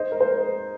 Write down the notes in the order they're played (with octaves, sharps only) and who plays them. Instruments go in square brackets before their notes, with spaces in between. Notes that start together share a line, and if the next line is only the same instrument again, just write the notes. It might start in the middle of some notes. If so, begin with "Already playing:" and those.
Already playing: [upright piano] C5 D#5
A#4
C5